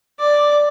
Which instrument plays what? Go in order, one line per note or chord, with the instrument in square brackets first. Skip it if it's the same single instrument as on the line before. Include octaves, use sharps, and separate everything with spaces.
[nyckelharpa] D5